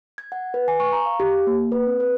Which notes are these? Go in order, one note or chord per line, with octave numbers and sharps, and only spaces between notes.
G#6
F#5
B4
G#5
C#6
A#5
F5
G4
A#3
B4
C4
B4